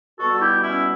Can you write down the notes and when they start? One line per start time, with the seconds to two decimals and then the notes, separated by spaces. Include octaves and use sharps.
0.18 B2 G3 B3 F#4 A4
0.35 F#4
0.40 E4 G4
0.62 C#4 E4